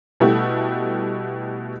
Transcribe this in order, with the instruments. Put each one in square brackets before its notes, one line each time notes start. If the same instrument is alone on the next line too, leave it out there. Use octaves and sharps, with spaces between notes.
[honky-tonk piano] B2 G3 A3 E4 F#4 G4